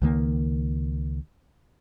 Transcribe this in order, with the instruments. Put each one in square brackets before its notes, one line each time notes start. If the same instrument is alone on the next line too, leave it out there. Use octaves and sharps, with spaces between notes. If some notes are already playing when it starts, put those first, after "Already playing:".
[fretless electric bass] C#2 D#3 F3 A#3